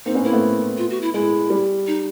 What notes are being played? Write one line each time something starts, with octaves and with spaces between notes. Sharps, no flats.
A#3 C4 D#4
B3 C#4
A#3 C4 E4
A3 B3
F4
F#4
E4
G#3 E4
G3
D#4